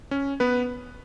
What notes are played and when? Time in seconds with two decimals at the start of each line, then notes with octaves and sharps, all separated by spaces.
0.11 C#4
0.40 B3 B4